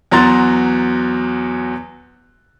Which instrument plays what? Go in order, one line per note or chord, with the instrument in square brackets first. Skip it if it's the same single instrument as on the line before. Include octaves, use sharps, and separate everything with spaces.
[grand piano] E2 F#3 F#4 A#5 C6 A6